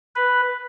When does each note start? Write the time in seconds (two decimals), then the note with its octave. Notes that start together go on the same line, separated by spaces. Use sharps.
0.15 B4